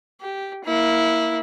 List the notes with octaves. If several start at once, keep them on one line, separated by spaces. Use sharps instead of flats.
G4
A#3 E4